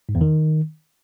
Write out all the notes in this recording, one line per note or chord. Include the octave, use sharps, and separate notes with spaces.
G#2
E2
D#3